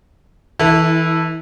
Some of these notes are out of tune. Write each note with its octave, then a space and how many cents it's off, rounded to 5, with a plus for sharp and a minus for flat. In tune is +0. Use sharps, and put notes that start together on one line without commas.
E3 -25 E4 +0 A4 +0